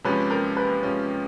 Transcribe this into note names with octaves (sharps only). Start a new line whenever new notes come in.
C3 F3 G#3 C#4 B4
A#4
B4
C3 F3 G#3 C#4